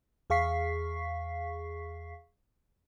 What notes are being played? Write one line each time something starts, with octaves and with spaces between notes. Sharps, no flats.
E2 G#4 F5 C#6 B6 C7